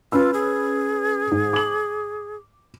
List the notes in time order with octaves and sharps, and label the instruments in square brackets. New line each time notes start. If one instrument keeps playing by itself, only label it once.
[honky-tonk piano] C#4 B4 E6 [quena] F4
[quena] G#4
[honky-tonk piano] G#2
D6 F#7